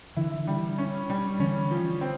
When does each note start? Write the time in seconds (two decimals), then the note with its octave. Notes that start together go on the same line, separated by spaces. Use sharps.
0.17 D3 E3 E4
0.47 G3
0.78 C#4
1.10 G3
1.40 D3 E3 C#4
1.71 F3
2.01 C4